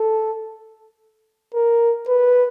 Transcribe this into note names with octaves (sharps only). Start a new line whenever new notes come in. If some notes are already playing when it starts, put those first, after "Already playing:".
Already playing: A4
A#4
B4